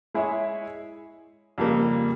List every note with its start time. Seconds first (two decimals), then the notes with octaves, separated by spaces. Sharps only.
0.14 G#3 E4 G#4 C#5 E5
1.58 F2 C#3 G3 A#3